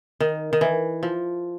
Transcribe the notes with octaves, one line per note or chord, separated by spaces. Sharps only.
D#3
D#3
E3
F3